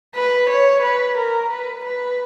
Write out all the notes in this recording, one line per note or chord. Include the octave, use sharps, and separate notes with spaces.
B4
C#5
B4
A#4
B4
B4